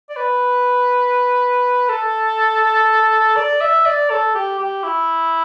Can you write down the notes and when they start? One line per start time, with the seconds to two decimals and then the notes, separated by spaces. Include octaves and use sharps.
0.09 D5
0.16 B4
1.89 A4
3.36 D5
3.61 E5
3.86 D5
4.10 A4
4.35 G4
4.58 G4
4.83 E4